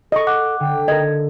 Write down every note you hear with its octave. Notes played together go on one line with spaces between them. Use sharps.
A4 D#5 C#6
F#5 D6 F#6
D3 G5
A#4 D#5 G#6